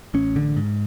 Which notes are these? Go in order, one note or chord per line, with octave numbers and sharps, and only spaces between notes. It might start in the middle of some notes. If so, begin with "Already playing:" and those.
A1 C#4
D3
G#2